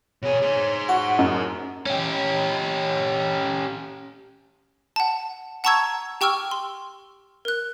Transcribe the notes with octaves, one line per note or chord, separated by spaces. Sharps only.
B2 G#4 C#5
G#4 C5
F#4 F#5
F#2
C#4 G4
F#5 A5
F#5 A5 A#5 C#6 E6 G#6
G4 G5 C#6 E6 F6
C6
A#4 F#6